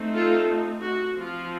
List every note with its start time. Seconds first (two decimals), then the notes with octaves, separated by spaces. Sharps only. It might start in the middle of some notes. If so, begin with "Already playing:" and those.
Already playing: A3 C4 D#4
0.14 F4 A4
0.81 F#4
1.15 F3 C4 F4